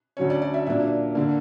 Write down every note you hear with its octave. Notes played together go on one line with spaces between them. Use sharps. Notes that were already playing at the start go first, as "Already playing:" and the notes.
D2 D3 F#3 C#4 C#5
D5
D5
E5
A#2 F#3 A#3 D4 E5
D3 A#3